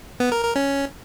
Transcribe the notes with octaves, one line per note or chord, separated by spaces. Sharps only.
B3
A#4
A#4
C#4